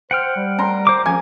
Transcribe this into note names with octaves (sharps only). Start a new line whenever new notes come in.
C5 F#5 G5 F6
G3
A#5 C6
C5 D6
F3 C#4 G#5